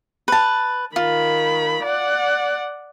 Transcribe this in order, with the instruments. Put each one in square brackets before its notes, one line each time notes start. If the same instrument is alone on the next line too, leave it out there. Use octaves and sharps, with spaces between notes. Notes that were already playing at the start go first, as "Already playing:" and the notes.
[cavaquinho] B4 A5
[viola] D#3 B5 [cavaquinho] F4
[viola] D5 F#5